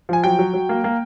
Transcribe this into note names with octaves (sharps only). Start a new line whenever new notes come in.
F3 G#5
F#3 G5
F#3
F#3
A#3
A#3